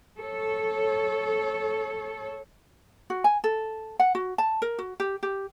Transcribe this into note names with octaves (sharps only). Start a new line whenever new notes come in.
A4 C#5
F#4
G#5
A4
F#5
F#4
A5
A#4
F#4
G4
G4